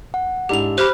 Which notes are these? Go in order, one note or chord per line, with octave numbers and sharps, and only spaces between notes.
F#5
G#2 D4 E4 G4 F7
G4 C5 B5 F6 F#6